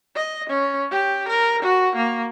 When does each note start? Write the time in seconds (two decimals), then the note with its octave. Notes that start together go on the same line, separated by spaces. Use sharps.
0.16 D#5
0.50 C#4
0.91 G4
1.28 A#4
1.63 F#4
1.96 A#3